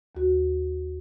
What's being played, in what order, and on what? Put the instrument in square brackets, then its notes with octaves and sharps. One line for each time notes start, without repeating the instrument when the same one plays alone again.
[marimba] D#2 F#4